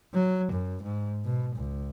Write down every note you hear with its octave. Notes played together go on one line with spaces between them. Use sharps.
F#3
F#2
G#2
B2
C#2